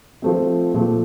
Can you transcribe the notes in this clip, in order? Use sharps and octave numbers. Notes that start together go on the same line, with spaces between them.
F3 A3 C4
A#2 F3 A3